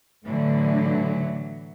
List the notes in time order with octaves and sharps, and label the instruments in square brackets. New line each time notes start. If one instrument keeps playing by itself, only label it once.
[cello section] A2 D3 [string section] E3 F#3